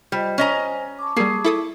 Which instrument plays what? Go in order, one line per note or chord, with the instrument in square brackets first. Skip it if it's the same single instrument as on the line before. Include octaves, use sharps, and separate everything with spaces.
[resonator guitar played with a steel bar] G3 [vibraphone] F4 C5 D#5
[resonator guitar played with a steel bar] C#4 D#5 A#5 [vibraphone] C5 G#5
[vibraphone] A5 C#6 D6
[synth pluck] G3 A#3 [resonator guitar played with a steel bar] G#4
[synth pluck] E4 A4 D#6